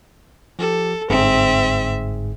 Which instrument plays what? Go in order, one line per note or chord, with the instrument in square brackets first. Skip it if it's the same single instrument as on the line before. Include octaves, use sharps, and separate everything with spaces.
[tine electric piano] F3 G4 [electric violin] A4
[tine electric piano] G1 G#2 G#4 [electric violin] C4 E5